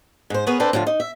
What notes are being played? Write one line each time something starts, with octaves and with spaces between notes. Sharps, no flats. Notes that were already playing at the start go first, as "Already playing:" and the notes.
G#2 C5
B3 G#4 A#4 B4 C#5
C4 D4 A4 B4 C5
A2 D3 F3 F4
D#4
E5